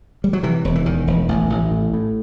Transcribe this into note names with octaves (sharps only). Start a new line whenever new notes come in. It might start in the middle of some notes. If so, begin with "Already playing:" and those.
G3
F#3
C3 E3
E1
E3
E2 D#3
E1
A1
A1
A2
A2